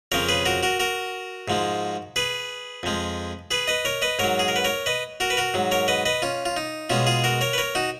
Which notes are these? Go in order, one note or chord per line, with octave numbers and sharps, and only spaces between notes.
F2 C#3 F3 A#4 C#5
G#4 B4
F#4 A#4
F#4 A#4
F#4 A#4
G#2 F3 G#3
G#4 B4
F2 F3 G#3
G#4 B4
B4 D#5
A#4 C#5
B4 D#5
G#2 F#3 A#4 C#5
G#4
A#4
B4
A#4 C#5
B4 D#5
F#4 A#4
B4
F#4 A#4
G#2 F#3
A#4 C#5
B4 D#5
B4 D#5
C#4 F4
F4
D#4
B2 G#3 C#4 F4
F4 G#4
F#4 A#4
A#4 C#5
B4
A#4 C#5
D#4 F#4